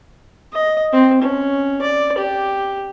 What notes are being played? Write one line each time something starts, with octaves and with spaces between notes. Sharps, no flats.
D#5
C4
C#4
D5
G4